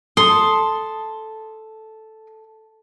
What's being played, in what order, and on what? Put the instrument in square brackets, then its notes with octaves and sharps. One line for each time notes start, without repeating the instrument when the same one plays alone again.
[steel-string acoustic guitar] A4 [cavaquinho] C6 D#6